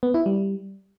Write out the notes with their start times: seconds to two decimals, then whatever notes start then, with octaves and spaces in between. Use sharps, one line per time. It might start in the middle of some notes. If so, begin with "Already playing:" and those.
0.03 B3
0.14 E4
0.26 G3